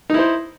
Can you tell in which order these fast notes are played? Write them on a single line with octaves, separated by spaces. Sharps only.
D#4 E4 C5